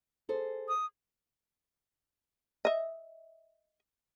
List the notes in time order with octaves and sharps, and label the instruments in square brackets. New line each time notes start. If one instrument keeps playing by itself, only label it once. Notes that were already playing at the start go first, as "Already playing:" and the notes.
[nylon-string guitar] G#4 A4 C5
[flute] D#6
[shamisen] D#5 E5